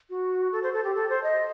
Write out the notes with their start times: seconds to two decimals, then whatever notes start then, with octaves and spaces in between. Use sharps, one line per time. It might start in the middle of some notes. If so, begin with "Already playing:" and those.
0.10 F#4
0.52 A4
0.63 C5
0.73 A4
0.84 G4
0.95 A4
1.09 C5
1.23 D#5